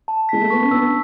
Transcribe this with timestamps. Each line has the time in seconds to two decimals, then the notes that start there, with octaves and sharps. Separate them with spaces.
0.08 A5
0.29 G#3 B6
0.42 A3
0.50 B3 C#6
0.62 C#4
0.71 B3 D4 E6